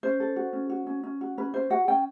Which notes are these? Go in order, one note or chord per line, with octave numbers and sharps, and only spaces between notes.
C#4 C5
A4
F#4
C#4
F#4
C#4
C#4
F#4
C#4 B4
C#4 C5
F#4 F#5
C#4 G5